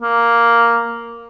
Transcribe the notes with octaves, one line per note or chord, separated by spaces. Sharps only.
A#3